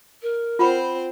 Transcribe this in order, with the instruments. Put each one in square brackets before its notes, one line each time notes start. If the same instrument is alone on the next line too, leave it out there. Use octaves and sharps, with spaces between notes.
[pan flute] A#4
[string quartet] C4 C5 [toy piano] F4 F#5 B5